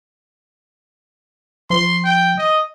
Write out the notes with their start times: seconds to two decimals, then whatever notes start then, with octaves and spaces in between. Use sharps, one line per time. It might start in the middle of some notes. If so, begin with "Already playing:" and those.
1.70 F3 C6
2.04 G5
2.38 D#5